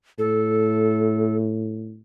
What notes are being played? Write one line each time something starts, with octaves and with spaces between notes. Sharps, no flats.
A2 A4